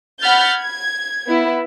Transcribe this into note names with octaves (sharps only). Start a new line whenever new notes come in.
F#5 B5 F6 G6 A6
G#6
B3 E4